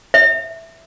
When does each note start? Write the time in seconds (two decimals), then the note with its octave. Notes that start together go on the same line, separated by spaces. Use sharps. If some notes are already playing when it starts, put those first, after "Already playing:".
0.14 E5